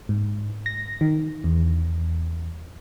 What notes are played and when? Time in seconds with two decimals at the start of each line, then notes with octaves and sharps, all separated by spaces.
0.09 G#2
0.66 A#6
1.01 D#3
1.44 E2